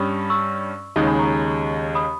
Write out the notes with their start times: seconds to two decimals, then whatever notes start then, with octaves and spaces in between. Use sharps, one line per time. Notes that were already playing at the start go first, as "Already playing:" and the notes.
Already playing: G2 G3 C#4 B5 C#6 D#6 E6
0.30 C#6 E6
0.96 D#2 C#3 G#3 D#4 D#6 G6
1.07 G#5 B5
1.18 A#5 C#6
1.95 B5 D#6